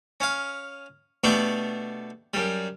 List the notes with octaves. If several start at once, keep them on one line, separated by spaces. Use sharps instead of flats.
C#4 F5
B2 A3 B3 D4 G4
F#2 G3